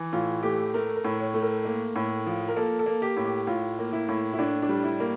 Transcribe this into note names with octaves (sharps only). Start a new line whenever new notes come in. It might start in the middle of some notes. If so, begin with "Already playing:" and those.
Already playing: E3
A2 F4
A3 G4
A3 A#4
A#4
A2
C#5
A3
A#4
A#3
A2
F3
A#4
A#3 A4
A4
A#3
G4
A2
G4
A2 F4
A#3
E4
A2
E4
A2 D4
D4
G3
E4
A#3